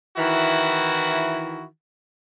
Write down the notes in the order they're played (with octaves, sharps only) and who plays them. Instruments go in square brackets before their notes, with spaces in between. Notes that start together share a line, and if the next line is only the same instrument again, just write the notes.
[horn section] D#3 E3 E4 F#4